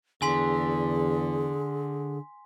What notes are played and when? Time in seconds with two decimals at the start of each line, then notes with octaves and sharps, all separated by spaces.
0.22 E2 D3 G#4 G#5 C6 B6